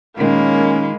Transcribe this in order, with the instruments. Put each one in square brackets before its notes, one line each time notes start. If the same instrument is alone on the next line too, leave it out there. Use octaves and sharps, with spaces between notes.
[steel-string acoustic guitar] A#2 D#3 [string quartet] G#3 [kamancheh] A#3 B5 [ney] C#4